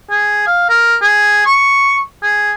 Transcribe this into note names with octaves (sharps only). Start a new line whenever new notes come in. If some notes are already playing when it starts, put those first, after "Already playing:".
G#4
F5
A#4
G#4
C#6
G#4